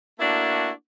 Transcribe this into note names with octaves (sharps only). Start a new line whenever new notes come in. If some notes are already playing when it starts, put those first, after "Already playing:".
A3 A#3 D4 E4 F#4